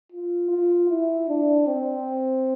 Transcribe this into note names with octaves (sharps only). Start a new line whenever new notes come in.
F4
F4
E4
D4
C4